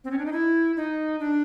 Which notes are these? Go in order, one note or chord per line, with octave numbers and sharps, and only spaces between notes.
C4
C#4
D4
D#4
E4
D#4
D4